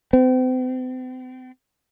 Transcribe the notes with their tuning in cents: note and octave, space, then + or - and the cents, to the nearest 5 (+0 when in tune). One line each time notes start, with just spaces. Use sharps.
C4 -40